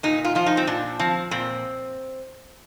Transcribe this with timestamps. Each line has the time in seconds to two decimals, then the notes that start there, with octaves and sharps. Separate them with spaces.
0.03 A#2 D#4
0.25 F4
0.35 F3 F4
0.46 D#4
0.57 C4
0.67 A#2 D4
0.99 F3 C4
1.31 A#2 C4